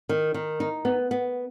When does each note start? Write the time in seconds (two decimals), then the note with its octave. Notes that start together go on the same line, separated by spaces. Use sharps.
0.09 D#3
0.34 D#3
0.60 D#4
0.85 B3
1.11 B3